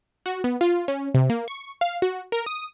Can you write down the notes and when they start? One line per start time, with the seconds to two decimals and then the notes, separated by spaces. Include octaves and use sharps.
0.26 F#4
0.44 B3
0.61 F4
0.88 C#4
1.14 C3
1.30 A#3
1.48 C#6
1.81 F5
2.02 F#4
2.32 A#4
2.46 D#6